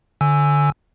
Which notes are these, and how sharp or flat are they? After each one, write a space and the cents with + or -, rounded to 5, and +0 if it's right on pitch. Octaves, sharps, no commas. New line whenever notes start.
D3 -5 G#5 +5 E6 +0